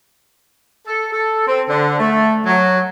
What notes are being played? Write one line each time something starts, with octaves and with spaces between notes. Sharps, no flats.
A4
A4
C4
D3
A3
F#3